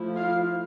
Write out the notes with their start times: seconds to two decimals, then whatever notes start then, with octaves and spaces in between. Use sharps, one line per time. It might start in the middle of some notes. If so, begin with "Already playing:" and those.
Already playing: F3 A3 E4
0.15 F4 F5